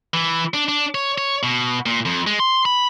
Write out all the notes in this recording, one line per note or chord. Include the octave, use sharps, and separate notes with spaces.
E3
D4
D4
C#5
C#5
B2
A#2
F2
G#3
C6
B5